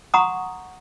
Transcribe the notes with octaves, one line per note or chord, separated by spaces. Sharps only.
F#5 A#5 C6 C#6 D#6